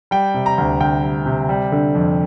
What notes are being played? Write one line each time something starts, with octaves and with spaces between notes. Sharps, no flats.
G3 G5
C3
A#5
D2
D2 G5
G3
C3
G3
D3
F2